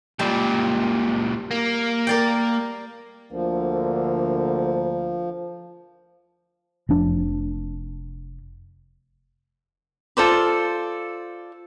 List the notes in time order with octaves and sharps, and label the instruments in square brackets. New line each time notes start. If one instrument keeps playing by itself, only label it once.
[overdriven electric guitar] C#2 A#2 [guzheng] G3
[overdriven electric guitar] A#3
[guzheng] A#4 D5 G5
[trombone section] D2 D3 A#3 [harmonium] F3
[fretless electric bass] F1 F3 D4
[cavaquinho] F4 A4 C5 D5